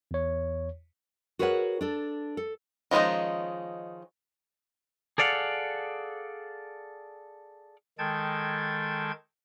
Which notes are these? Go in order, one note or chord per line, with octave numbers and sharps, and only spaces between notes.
E2 C#5
F#4 G#4 A#4 B4 C#5 F#5
D4 A4
A4
D#3 F3 G#3 C#4 D#4
G#4 A4 D5 F5 F#5
D#3 G#3 A4 G5 A5 G#6